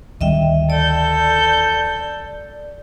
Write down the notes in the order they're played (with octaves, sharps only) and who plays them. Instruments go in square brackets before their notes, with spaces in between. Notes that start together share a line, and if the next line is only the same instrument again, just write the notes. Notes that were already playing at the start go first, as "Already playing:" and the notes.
[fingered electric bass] D2 D#3 G3 [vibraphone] D#5 E5 G5
[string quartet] A4 G6 [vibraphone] D5